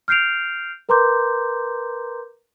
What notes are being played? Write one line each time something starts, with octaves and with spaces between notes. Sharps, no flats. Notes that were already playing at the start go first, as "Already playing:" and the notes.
F6 G6 C7 D7 F7
A#4 B4 A#5 C6 D6 G6